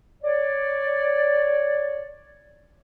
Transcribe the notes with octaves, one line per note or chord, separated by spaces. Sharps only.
C#5 D5